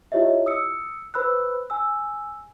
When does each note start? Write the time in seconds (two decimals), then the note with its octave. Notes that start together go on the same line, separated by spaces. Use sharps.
0.12 E4 F4 G4 C#5 D#5 E5
0.46 D#6 E6 C#7
1.14 B4 C5 B5 E6 F#6
1.70 G#5 E6